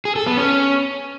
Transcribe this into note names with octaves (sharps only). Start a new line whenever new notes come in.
G#4
A4
B3
C#4